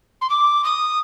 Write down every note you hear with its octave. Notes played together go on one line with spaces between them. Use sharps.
C6
D6
D#6